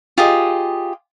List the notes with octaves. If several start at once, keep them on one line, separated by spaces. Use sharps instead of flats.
F4 G4 G#4 D#5